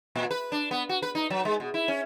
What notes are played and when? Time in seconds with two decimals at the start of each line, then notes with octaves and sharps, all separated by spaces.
0.16 A#2
0.31 B4
0.52 D4
0.71 B3
0.89 F#4
1.02 B4
1.15 D#4
1.30 F#3
1.45 G#3
1.60 B2
1.74 E4
1.88 C#4